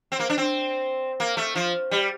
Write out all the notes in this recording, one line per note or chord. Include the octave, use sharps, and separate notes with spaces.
C4
A#3
D4
C4
A#3
A3
F3
G3